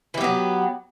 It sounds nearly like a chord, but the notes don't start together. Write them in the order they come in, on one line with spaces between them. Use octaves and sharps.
E3 G4 B3 F#3